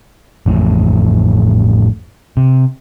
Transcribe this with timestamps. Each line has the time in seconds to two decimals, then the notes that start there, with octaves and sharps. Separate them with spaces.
0.46 A1 F2 A2
2.37 C3